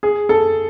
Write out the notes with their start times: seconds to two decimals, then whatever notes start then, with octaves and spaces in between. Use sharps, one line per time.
0.03 G#4
0.29 A4